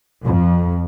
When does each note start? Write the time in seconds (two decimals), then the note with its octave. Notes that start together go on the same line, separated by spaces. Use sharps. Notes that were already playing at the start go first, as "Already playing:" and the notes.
0.25 F2